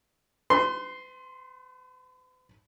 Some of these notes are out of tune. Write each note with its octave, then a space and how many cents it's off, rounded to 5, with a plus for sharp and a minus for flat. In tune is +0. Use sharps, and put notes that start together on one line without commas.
B4 +45 C6 +0